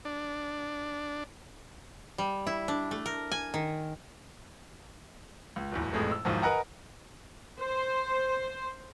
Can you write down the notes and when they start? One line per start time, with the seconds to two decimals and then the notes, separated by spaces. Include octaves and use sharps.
0.05 D4
2.18 G3
2.47 E4
2.68 D4
2.91 A3
3.06 A#4
3.32 G#5
3.54 D#3
5.56 C#2
5.72 D1 G1 E2
5.93 A1 F2 G#3 A3
6.11 E6
6.25 B1 E2 G#2 D#3 F3
6.42 A#4 B4 D#5 F#5 G#5 A#5
7.60 C5